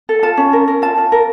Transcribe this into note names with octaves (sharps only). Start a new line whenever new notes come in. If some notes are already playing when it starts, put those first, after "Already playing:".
A4
F4 A5
C#4
A#4
A#4
F4 A5
F4
A#4